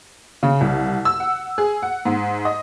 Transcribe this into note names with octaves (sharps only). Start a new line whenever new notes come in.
C#3
C2
E6
F#5
G#4
F#5
G#2
D#5